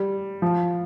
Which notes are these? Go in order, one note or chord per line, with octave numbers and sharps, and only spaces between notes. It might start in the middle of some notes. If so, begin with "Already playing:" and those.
Already playing: G3
F3